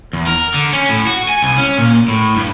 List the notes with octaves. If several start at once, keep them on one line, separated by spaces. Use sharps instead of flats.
E2
A#4
D3
C#4
A2
F#4
G#5
C2
C#4
A#2
A2
G2